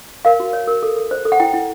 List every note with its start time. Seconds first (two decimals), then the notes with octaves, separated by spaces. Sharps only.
0.25 A#4 F5
0.40 F#4
0.53 C#5
0.67 A#4
0.83 A4
0.96 A4
1.11 C5
1.25 A4
1.32 F#5
1.40 E4 G5
1.54 E4